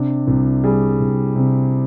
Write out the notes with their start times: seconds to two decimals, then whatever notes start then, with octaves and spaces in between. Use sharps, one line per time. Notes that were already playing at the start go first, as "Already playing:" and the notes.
Already playing: C3 D4
0.27 C2
0.64 G3 G#4
1.00 C2
1.36 C3